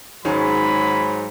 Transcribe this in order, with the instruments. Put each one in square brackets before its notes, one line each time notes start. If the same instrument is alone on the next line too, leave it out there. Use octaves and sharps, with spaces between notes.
[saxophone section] G#2 F#3 [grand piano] D#3 G#3 C#4 [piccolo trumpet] B5